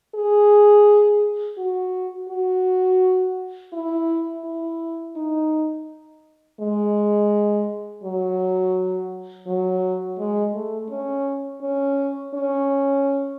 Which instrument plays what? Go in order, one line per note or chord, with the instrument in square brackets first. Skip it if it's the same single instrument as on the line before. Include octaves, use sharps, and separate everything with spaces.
[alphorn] G#4
F#4
F#4
E4
E4
D#4
G#3
F#3
F#3
G#3
A3
C#4
C#4
C#4